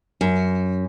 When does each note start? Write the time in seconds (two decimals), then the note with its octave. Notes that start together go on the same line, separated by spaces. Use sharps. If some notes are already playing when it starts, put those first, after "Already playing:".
0.21 F#2